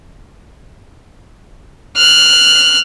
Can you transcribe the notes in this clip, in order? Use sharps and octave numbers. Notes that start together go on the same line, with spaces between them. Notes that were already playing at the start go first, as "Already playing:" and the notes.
F6 F#6